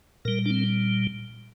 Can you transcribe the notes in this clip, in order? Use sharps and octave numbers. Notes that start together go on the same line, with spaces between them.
A#2 G3 A#4
D4
C4